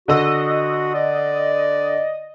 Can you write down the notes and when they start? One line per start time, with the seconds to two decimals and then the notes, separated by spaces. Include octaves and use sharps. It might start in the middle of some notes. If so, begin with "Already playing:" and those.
0.08 D3 F#4 D#5 E6
0.95 D5